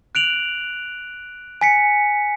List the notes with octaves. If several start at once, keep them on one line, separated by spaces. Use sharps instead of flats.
F#6 D7 F7 F#7
G#5 B6 C#7